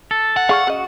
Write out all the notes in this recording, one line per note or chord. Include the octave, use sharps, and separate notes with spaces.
A4
F#5
G#4 D5 F5 C#6 F6
C#3 F#4 D#5